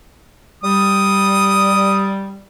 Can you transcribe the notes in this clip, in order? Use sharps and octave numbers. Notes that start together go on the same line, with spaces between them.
G3 D#6